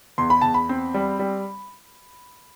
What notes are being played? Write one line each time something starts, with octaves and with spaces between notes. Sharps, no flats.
E2 C6
B5
E2 A5
B5
C4
G3
G3